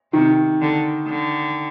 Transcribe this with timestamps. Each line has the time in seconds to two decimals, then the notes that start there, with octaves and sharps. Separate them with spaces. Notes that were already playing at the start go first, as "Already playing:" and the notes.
0.13 C3 D#3
0.61 D3
1.07 D3